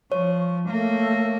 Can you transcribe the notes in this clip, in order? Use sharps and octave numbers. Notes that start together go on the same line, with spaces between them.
F3 C#5 C#6
A3 A#3